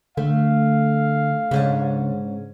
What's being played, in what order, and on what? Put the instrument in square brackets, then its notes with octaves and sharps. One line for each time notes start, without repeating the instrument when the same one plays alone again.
[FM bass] D3 [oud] A3 [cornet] F5
[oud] G#2 C#4 D4 [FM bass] C#3